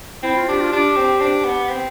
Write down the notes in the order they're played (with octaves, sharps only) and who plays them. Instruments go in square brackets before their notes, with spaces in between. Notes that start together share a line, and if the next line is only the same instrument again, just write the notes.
[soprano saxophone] C4 [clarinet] E4
[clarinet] F4
[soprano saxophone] D4 [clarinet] G4
[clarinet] F4
[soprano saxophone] D4 [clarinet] G4
[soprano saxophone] C4
D4
B3
C4